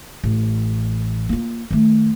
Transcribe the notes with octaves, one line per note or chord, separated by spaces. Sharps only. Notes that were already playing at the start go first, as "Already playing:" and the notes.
A1
A#3 F4
D#3 A3